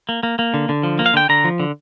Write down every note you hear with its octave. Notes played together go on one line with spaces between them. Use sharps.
A#3
A#3
A#3
D3
D3
F3
A#3
F5
D3 G5
D3 A#5
F3
D3